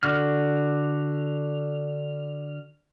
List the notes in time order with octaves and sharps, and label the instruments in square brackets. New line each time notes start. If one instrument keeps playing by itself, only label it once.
[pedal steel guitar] D3 F#4 F6